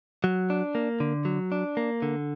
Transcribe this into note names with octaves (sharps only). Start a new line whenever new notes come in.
F#3
D4
A#3
D3
F#3
D4
A#3
D3